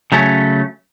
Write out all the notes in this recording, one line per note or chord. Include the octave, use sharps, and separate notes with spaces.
C#3 F#3 A3 C#4